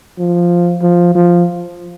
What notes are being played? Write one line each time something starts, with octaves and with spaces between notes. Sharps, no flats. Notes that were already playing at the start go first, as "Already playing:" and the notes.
F3
F3
F3